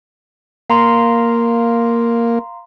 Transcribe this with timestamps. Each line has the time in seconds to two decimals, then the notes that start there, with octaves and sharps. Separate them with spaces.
0.70 A#3 F5 A#5 C6